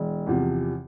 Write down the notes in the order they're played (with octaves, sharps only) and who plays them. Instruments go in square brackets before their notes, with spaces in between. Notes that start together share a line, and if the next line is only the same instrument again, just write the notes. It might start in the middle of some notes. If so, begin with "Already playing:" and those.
Already playing: [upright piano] E1
E2 C3 F3